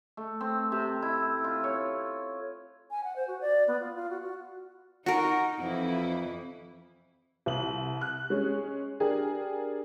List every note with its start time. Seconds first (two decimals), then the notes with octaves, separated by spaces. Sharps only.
0.17 A3
0.41 C4
0.72 C3
1.02 E4
1.44 F4
1.64 C#5
2.90 G#5
3.03 F#5
3.15 C5
3.27 F#4
3.40 D5
3.67 B3
3.80 F4
3.95 F4
4.10 F#4
4.21 F#4
5.06 D#4 F#4 A#4
5.60 F2 E3 E4
7.46 C2 F#7
8.01 F#6
8.30 G#3 C#4
9.00 D4 G4 G#4 A#4